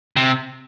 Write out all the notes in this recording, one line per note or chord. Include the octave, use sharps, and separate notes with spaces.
C3